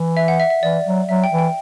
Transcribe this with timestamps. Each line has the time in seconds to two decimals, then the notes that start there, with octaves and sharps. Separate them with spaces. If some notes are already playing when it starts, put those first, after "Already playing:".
Already playing: E3
0.17 E5
0.28 F#5
0.40 E5
0.50 E5
0.62 E3 D5
0.85 F#3
1.09 F#3 E5
1.24 G5
1.31 E3
1.39 G5